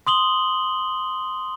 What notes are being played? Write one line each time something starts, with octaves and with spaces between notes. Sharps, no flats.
C6 D#6 F#7 G7